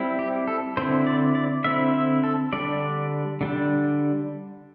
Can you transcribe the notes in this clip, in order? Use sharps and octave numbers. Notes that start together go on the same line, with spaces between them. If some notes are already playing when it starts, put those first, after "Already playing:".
Already playing: G3 C4 E4
G4
A4
D3 C4 E4 C5
D5
D5
D3 C4 E4 E5
E5
A4
D3 G3 D4 D5
D3 G3 D4